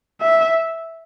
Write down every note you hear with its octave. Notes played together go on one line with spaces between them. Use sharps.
E5